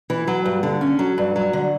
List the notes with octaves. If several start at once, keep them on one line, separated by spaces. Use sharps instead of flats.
E3
F#3
G2
D3
C#4
F#3
G2
F#3
D3